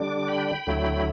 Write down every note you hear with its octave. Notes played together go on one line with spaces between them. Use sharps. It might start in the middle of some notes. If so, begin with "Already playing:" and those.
Already playing: D3 G3 D4 D6
G5 B5
D2 D3 F#3 A3 E4